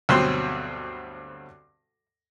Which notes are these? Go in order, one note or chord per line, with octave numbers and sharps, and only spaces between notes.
D2 G2 B2 F#3 C4 C6